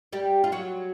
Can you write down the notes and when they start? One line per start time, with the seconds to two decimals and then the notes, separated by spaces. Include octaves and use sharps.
0.13 G3 G4
0.44 F4
0.52 F#3 F#4